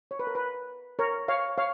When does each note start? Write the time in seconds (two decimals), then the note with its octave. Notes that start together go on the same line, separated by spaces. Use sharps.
0.11 C#5
0.19 B4
0.27 A#4
0.35 B4
0.99 A#4 C#5
1.28 C#5 F5
1.58 C#5 F5